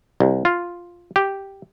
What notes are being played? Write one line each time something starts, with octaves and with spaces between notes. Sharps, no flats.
C2
F4
G4